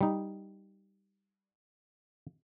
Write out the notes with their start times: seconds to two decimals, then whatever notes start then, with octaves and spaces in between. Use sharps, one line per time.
0.01 G3 D#4